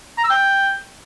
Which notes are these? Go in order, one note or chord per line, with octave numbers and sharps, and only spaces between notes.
A#5
E6
G5